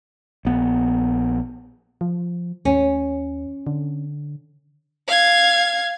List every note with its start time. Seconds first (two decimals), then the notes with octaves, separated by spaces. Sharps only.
0.45 A#1 B3
2.01 F3
2.65 D#2 C#4
3.67 D3
5.07 F5 G#6